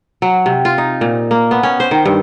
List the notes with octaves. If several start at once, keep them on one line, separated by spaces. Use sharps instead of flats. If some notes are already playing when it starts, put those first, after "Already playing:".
F#3
C3
F4
D#4
A#2
A#3
B3
C#4
C5
D#3
G2